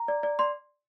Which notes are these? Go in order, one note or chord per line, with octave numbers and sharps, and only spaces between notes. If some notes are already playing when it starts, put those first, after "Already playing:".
Already playing: A#5
D5
D5
D5 C6